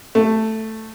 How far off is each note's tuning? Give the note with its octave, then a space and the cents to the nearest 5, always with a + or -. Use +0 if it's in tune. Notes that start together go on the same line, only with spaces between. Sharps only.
A3 +5